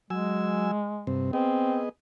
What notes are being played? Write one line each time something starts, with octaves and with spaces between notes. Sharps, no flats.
F#3 G#3 G#5 E6
G2 C3 C4
B3 C4 G#4 D#5